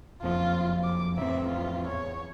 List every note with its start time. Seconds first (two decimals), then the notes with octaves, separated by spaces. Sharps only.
0.23 F#1 F2 F3 F4
0.84 D6
1.17 A1 F2 C4 E5
1.48 F4
1.87 E2 C#5